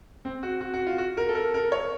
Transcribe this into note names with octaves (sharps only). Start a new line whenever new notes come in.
C4
F#4
F#4
F#4
F4
F#4
A#4
A4
A#4
A#4
C#5